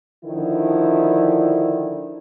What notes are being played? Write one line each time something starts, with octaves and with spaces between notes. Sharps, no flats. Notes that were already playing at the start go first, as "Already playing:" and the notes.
D3 D#3 F3 E4